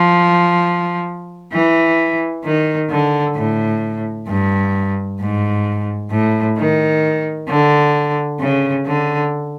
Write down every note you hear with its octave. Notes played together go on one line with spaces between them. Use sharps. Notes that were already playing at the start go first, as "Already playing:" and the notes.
Already playing: F3
E3
D#3
D3
A2
G2
G#2
A2
D#3
D3
C#3
D3